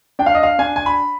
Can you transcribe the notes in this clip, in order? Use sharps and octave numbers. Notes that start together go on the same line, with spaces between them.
D4 G5
F5
D#5
F5
D4 G#5
G#5
B5